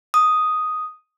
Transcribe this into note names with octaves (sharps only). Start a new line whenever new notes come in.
D#6